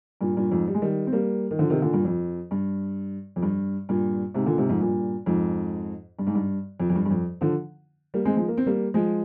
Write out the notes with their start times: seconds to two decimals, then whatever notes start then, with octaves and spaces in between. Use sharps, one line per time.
0.21 G2 A#2
0.37 G2 A#2
0.51 F2 G#2
0.68 G3
0.74 G#3
0.82 D#3 G3
1.07 C4
1.12 G3 A#3
1.51 D#3
1.59 D3 F3
1.70 C3 D#3
1.82 A#2 D3
1.94 G2 A#2
2.05 F2
2.51 G2
3.36 F2
3.42 G2
3.89 G2 A#2
4.34 G#2 C3
4.46 A#2 D3
4.58 G#2 C3
4.69 F2 G#2
4.80 G2 A#2
5.26 F2 G#2
6.19 G2
6.27 G#2
6.35 G2
6.80 F2
6.90 F2
6.95 G2
7.05 G2
7.10 F2
7.41 D3 F3
8.14 G3 A#3
8.25 G#3 C4
8.37 F3 G#3
8.48 A#3
8.58 C4
8.66 G3 A#3
8.94 F3 G#3